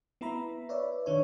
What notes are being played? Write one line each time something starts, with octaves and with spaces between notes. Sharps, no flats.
B3 E4 E5 A#5 B5
B4 C#5 D5 E5
D#3 D4 C#5